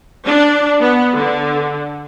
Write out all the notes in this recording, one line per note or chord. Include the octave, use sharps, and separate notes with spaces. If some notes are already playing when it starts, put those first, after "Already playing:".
D4
B3
D3